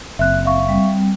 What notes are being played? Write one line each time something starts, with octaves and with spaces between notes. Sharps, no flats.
F#1 C4 E5 F#6
E5 F5 C#6
G3 C4